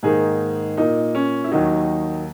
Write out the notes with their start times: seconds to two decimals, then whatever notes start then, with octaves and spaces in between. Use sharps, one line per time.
0.03 G#2 D#3 A#3 G#4
0.77 A#2 A#3 D#4
1.15 C#4
1.44 E4
1.52 D#2 D#3 F#3 D#4